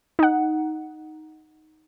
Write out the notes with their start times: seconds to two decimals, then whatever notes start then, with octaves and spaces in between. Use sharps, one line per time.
0.19 D#4 F#5